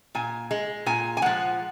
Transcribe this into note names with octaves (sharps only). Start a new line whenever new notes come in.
A#2 G#5
G#3
A#2 G#5
G#5
F3 G#3 F#5